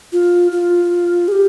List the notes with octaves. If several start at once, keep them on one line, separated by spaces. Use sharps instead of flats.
F4
F4
G#4
G4